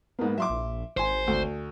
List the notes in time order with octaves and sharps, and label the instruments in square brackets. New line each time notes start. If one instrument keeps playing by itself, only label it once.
[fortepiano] G#2 A#3 [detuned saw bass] B3
[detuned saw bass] F#3 [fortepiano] E5 C6 D6
[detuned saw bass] A#1
[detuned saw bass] G#1 [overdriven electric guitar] C5 [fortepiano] G#5 C6
[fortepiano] D2